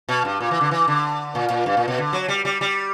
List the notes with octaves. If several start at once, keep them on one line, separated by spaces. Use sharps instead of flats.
B2
G2
A#2
E3
D3
E3
D3
A#2
A#2
G2
A#2
B2
D3
F#3
G3
G3
G3